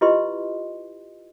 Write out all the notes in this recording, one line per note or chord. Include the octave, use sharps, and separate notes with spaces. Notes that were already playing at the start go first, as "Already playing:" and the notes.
E4 F4 G4 B4 D#5 C6